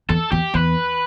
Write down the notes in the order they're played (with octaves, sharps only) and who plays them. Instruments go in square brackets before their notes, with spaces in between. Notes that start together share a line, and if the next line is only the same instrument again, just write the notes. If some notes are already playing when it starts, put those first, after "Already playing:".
[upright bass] E2 [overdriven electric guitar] A4
[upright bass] E2 [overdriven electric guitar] G4
[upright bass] E2 [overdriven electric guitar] B4